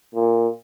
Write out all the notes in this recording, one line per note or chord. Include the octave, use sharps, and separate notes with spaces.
A#2